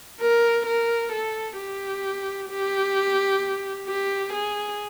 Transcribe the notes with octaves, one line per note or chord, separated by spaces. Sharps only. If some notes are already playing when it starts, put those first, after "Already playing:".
A#4
A#4
A4
G4
G4
G4
G#4